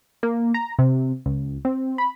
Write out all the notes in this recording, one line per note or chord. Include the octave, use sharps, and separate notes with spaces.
A#3
A#5
C3
C#2
C4
B5